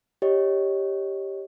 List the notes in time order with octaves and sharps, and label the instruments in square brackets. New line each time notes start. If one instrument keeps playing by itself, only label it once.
[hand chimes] G4 C#5 D#5